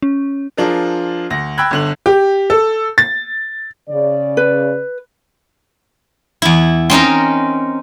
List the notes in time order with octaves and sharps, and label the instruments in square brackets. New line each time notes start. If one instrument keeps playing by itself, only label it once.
[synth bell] C#4
[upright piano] F3 D4 F4 G#4 A#4
D2 A#6
G5 B5 E6 F#6 G#6
G1 D3 F#7
G4
A4
A6
[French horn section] C#3 D5
[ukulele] B4
[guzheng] E2 E4
C4 C#4 D#4 A#4